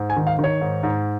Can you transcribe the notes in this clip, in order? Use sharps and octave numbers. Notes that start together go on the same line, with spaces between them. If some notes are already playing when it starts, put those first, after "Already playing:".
Already playing: G#2
G#5
D#3
F5
D#3
C#5
G#2
G#2